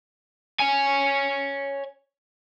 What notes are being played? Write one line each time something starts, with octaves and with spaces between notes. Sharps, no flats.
C#5 G#5